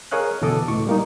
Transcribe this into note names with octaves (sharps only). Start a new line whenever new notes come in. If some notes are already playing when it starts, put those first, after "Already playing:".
G#4 A#4 C#5 D#5 F5 F#6
E2 B2 D3 A4 D#5 D6
C#2 A2 C#6 D6
G3 A#3 D#4